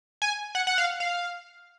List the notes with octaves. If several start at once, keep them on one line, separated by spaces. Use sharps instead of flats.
G#5
F#5
F#5
F5
F5